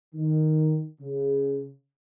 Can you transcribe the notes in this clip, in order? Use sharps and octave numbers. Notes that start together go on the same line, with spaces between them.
D#3
C#3